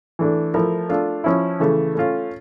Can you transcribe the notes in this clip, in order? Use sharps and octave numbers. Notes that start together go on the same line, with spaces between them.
E3 A3 D4
F3 A3 E4 A#4
A3 D4 F4 A4
F3 C#4 E4
C#3 E3 A3
A3 C#4 F4